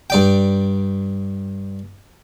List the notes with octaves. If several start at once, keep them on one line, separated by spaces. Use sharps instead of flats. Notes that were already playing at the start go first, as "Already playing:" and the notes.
G2 D5 G5